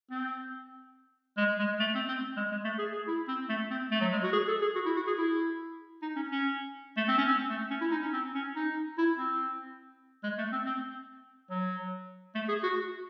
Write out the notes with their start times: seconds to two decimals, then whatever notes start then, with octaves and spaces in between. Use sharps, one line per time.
0.11 C4
1.37 G#3
1.59 G#3
1.80 A3
1.95 C4
2.08 C4
2.37 G#3
2.51 G#3
2.64 A3
2.79 G#4
2.92 G#4
3.07 E4
3.28 C4
3.49 A3
3.70 C4
3.91 A3
4.01 F#3
4.12 G#3
4.23 F#4
4.33 G#4
4.48 A4
4.61 G#4
4.75 F#4
4.85 E4
4.96 F#4
5.07 G#4
5.17 E4
6.02 D#4
6.16 C#4
6.31 C#4
6.97 A3
7.08 C4
7.18 C#4
7.28 C4
7.50 A3
7.71 C#4
7.81 E4
7.91 D#4
8.02 C#4
8.13 C4
8.35 C#4
8.55 D#4
8.98 E4
9.18 C4
10.23 G#3
10.38 A3
10.52 C4
10.66 C4
11.50 F#3
12.35 A3
12.48 G#4
12.63 F#4